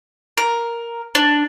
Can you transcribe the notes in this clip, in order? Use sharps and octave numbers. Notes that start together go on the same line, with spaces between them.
A#4
D4